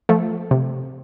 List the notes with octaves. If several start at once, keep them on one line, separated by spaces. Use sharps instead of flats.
F3 A3
C3